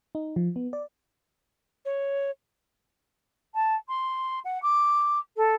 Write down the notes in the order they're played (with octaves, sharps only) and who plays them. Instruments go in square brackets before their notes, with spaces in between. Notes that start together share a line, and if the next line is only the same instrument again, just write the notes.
[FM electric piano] D#4
F3
B3
D5
[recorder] C#5
[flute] A5
C6
F#5
D6
A4